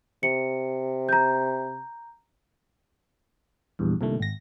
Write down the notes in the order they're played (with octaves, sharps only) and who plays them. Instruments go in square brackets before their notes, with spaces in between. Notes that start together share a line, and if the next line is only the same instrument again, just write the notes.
[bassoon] C3 [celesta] C#7
[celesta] A#5 G6
[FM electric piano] A#1 E2 G2
C2 G2 A#2 D#3 A3
G#1 A#6